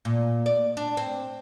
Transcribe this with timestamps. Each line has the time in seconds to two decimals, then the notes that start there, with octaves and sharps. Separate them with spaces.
0.05 A#2
0.46 D5
0.77 D4
0.97 C4